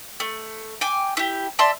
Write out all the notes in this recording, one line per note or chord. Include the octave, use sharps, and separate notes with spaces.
A3
G5 G#5 D6
E4 G4
D5 E5 A5 C6